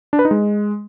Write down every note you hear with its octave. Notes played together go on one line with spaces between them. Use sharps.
D4
B4
D#4
G#3